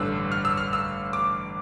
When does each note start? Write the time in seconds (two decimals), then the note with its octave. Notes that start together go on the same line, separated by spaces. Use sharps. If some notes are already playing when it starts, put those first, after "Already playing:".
Already playing: A1 G2 D3 E6
0.32 F6
0.45 E6
0.58 F6
0.73 E6
1.13 D6